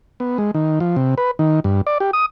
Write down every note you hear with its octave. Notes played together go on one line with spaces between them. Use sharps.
B3
G#3
D#3
F3
C3
B4
D#3
G2
D5
G4
D#6